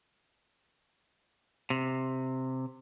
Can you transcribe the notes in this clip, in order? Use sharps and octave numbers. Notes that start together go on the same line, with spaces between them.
C3